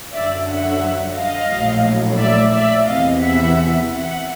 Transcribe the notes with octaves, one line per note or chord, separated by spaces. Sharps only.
F#2 D3 F#3 D5 E5
E5 F#5
D#5 F5
A#1 A2 F#3
D5 E5
D5 E5
E2 C3 E3 D#5 F5
E5 F#5
E5 F#5